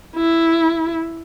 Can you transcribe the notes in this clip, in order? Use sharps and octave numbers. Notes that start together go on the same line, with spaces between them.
E4